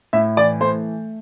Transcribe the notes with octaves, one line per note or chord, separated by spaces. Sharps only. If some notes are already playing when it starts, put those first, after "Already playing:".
A2 E5
E3 D5
A3 C5